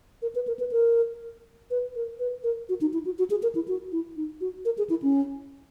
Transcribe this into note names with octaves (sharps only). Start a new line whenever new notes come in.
A#4
B4
A#4
B4
A#4
B4
A#4
B4
A#4
F#4
D#4
E4
F#4
F#4
G#4
A#4
E4
F#4
E4
D#4
F#4
A#4
G#4
E4
C#4